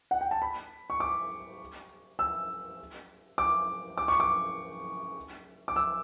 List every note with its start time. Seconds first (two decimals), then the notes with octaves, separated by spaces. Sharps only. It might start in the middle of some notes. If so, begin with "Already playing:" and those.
0.11 F#5
0.21 G5
0.31 A5
0.42 B5
0.90 C#6
1.00 D6
2.19 E6
3.38 D6
3.97 D6
4.08 C#6
4.20 D6
5.68 D6
5.76 E6